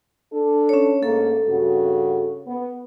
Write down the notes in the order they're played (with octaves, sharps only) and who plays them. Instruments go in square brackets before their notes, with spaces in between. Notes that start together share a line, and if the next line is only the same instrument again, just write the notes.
[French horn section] D4 A4
[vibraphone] C#4 C#5
[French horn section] G#2 A3 A#3 [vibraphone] A4
[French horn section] G2 C#3 F#4
B3